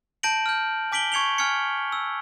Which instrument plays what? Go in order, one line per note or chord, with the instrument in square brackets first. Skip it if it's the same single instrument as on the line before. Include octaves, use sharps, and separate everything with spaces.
[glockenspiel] A5 G6 A#6 D7 F#7
F6 G6
G#5 D6 B6 D7 F#7 G7
C#6 G#6 C#7 F7 G7
G#5 F6 G#6 C#7
E6